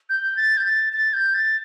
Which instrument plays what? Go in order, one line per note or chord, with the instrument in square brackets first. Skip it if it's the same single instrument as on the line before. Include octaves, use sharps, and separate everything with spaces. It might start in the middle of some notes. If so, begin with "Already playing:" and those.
[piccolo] G6
A6
G6
A6
A6
G6
A6